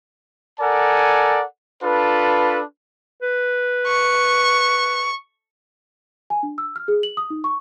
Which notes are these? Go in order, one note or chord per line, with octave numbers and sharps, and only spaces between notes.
A4 A#4 D5 F#5 G#5
D4 F4 A4 B4
B4
C#6
G#5
D4
E6
F6
G#4
F#7
D#6
D#4
C#6